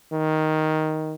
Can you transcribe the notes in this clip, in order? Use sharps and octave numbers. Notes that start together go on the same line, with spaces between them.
D#3